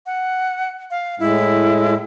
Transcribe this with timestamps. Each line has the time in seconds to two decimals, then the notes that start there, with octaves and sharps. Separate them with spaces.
0.06 F#5
0.91 F5
1.20 A2 G#3 E4